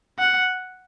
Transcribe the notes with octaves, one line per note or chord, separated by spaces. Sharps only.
F#5